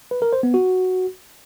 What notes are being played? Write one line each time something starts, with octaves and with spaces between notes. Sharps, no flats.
B4
A#4
C5
B3
F#4